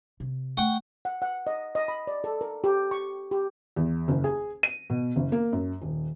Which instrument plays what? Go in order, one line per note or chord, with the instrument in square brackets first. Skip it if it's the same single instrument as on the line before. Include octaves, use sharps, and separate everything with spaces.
[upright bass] C3
[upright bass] A3 [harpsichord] F#5 G5 C#6
[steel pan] F#5
F#5
D#5
D#5
B5
D5
A4
A#4
G4
C#6
G4
[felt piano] E2
F#1
G#4
D#7
B2
F#1
A#3
F#2
D#1